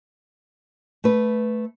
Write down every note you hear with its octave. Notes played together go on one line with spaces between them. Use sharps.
A3 B4